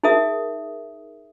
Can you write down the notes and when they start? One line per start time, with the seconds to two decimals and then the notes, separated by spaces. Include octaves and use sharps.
0.03 D#4 G#4 A#4 E5 D#6